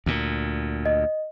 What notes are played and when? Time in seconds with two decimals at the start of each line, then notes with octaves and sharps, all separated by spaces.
0.06 D2 A#2
0.86 D#5